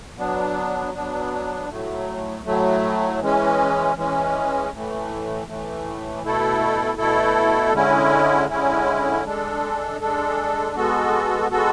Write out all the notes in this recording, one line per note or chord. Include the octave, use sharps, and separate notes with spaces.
F#3 B3 D4
F#3 B3 D4
A2 F#3 A3
A2 F#3 A3
E3 G#3 C#4
E3 G#3 C#4
A2 E3 A3
A2 E3 A3
B2 A3 E4 A4
B2 A3 E4 A4
D3 G#3 C#4 E4
D3 G#3 C#4 E4
G#3 D4 A4
G#3 D4 A4
G#3 B3 F#4 A4
G#3 B3 F#4 A4